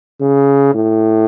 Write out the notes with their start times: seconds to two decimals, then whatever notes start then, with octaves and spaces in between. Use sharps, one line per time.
0.21 C#3
0.75 A2